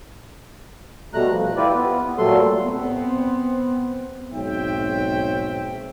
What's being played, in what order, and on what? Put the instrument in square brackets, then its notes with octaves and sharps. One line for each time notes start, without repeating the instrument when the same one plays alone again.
[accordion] B2 G3 A3 A#5 F#6
F3
E4 F4 G4 B4 D5
B3 B4
B3
A#2 F#3 G3 A3 A4 C6
[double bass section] B3 C4
[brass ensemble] B1 G#2 C4 C#5 E5 G5